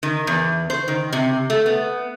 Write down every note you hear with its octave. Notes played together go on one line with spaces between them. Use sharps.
D#3
E2
C5
D#3
C3
A3
B3